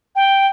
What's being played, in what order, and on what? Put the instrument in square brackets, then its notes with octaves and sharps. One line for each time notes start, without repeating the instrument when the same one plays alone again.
[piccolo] G5